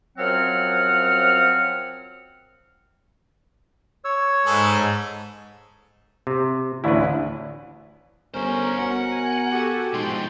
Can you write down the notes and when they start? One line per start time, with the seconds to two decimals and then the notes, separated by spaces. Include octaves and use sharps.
0.17 F#2 F3 F#3 C4 F#5 F6
4.04 C#5 E6
4.46 G#2 G#4 A4 B4
6.27 C3
6.84 A1 D2 E4 B4
8.34 G1 D3 C#4 A#4 C5
8.79 B2 F#5
9.12 G#5
9.50 F#4 G4 A4
9.93 G#2 B2 F3 G5 C6